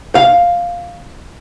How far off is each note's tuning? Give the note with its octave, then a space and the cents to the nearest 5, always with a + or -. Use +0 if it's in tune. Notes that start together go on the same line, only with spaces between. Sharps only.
F5 +5